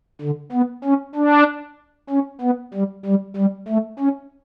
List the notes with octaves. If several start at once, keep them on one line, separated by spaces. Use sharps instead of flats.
D3
B3
C#4
D4
C#4
B3
G3
G3
G3
A3
C#4